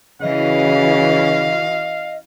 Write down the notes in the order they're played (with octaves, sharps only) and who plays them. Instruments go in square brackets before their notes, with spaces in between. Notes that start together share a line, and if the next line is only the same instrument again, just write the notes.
[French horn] C#3 [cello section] E3 C#4 F#4 [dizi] D#5 [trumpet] F5